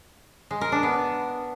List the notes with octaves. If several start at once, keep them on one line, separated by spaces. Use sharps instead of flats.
G#3
A#4
D4
B3